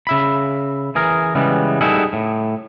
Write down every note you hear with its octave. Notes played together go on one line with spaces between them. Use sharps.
C#3 E5 B5
E3 G#4 A#4
C#3 E3 G3 G#3 B3
G3 D#4 E4 F#4 G#4 A4
A2